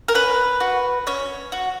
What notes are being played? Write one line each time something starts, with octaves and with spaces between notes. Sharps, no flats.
A#4
C#4 B4
F#4
C#4 C#5
F#4